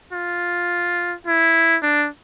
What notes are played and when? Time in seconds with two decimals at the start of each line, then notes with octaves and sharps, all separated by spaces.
0.13 F4
1.27 E4
1.82 D4